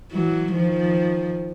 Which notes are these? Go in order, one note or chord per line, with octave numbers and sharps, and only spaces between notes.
E3 F#3
D#3 F3